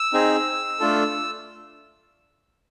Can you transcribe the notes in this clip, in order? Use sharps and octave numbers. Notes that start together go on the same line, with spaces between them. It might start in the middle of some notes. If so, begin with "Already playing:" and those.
Already playing: E6
C4 D#4 G#4
A3 D4 F4 A4